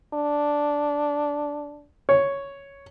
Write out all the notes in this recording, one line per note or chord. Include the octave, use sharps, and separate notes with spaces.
D4
C#5